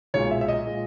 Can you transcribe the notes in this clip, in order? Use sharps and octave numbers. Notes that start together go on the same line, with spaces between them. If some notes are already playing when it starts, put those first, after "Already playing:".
B1 A#2 G#3 C#5
E5
E5
D#5
A#2 G#3